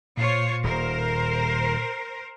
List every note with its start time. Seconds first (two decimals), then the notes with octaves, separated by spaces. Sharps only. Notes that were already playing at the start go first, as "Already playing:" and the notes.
0.17 A#2 F4 C5 C#5
0.64 D#1 A#4 C5